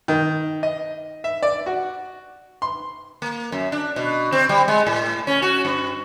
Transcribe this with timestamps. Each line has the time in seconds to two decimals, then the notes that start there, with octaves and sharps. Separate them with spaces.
0.08 D#3
0.63 D#5
1.24 E5
1.43 D5
1.66 F#4
2.62 C6
3.22 A#3
3.52 F#2
3.72 D4
3.96 B2
4.32 C4
4.49 G3
4.68 G#3
4.87 A2
5.27 C#4
5.42 F#4
5.65 G2